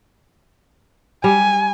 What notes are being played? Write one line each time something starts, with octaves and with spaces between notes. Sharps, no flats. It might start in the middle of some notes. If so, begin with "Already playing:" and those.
G3 G#5